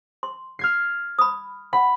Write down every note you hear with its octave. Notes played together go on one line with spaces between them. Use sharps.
C6
F6 G#6 C7
B5 D#6
F#5 B5